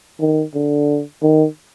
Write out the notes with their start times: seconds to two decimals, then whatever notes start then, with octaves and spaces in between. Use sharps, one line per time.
0.20 D#3
0.54 D3
1.22 D#3